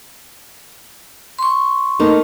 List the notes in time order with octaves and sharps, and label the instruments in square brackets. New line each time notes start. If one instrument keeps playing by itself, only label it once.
[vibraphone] C6 C#6
[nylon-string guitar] A3 A#3 D#4